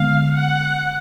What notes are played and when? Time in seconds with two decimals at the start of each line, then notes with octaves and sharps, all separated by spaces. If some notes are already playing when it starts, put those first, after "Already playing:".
Already playing: D3 G#3 B3 F5
0.35 F#5